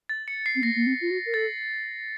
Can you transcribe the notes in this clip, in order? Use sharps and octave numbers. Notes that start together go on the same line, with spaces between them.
A6
C#7
C7
C4
A#3 A#6
A#3
C4
F4
F#4
A#4
A4 A6